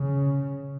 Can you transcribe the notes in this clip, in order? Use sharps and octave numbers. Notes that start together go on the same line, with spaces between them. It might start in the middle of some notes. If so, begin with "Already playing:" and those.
Already playing: C#3